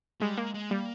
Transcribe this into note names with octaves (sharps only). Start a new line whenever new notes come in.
G3 G#3
G#3 A#3
G#3
G3 A#3